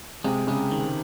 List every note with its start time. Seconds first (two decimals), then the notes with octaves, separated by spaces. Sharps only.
0.24 C3 G#3
0.47 C#3 G#3
0.71 D#3